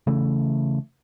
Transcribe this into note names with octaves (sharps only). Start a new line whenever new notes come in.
C#3 E3 A3